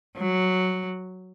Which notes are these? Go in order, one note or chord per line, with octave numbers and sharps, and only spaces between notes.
F#3